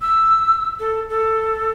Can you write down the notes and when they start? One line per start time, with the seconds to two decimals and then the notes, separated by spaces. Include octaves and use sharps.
0.02 E6
0.80 A4
1.09 A4